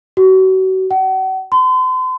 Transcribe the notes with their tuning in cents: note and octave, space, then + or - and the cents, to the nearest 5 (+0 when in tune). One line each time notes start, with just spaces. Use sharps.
F#4 +35
F#5 +40
C6 -40